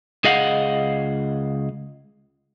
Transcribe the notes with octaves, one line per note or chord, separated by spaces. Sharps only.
C#2 G#4 D#5 F5 F#5